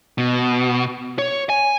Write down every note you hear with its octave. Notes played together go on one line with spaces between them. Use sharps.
B2
C#5
G#5